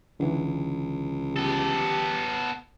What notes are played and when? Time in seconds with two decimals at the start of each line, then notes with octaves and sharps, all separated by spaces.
0.20 C#2 D3 E3
1.36 B3 G4 A4